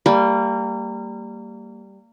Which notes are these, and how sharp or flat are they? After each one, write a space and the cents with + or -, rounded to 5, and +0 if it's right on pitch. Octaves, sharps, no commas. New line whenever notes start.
G3 +0 A#3 -25